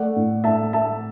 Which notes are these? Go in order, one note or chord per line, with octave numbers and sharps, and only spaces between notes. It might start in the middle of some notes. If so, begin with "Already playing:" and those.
Already playing: A3 D5 F#5
A2
A2 E5 A5
A3 E5 A5